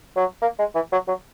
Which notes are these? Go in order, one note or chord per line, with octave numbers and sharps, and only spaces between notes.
F#3
A#3
G#3
E3
F#3
F#3